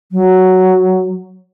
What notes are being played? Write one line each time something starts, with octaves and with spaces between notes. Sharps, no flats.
F#3